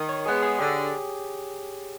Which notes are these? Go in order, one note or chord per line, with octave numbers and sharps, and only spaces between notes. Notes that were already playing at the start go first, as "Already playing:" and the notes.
Already playing: D#3
C#5
G#3 B3 G#4
G#4
D3 G4